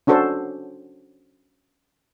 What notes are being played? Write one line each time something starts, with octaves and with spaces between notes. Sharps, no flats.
C#4 D4 F#4 A4 C5